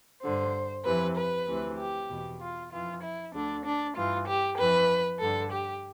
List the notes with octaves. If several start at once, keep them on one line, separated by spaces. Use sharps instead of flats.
G2 D3 C5
F2 C3 E3 B4
B4
D2 C3 E3
G4
E2 B2
F4
F2 E3 F4
E4
D2 D3 D4
D4
G2 E3 F4
G4
F2 E3 B4
G2 D3 A4
G4